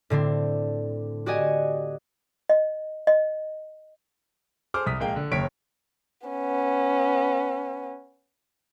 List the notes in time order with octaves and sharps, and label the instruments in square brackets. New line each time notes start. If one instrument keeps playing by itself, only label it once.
[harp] A2 D3 C4 D4
F#4 G4 D5 D#5 G#5
[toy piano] D#5
D#5
[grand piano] G#4 A4 C5 D6 F6
C2 D#6 F6 B6
A#1 G#3 A#3 F5 G5
D3
F#1 D#2 C#5 B6 D7
[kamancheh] B3 C#4